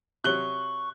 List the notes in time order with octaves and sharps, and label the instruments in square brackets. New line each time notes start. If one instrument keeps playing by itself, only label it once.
[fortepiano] C3 F#3 [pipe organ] C#6 [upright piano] F#6 G7